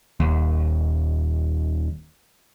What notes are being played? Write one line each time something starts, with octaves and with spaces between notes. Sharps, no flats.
D#1 D#2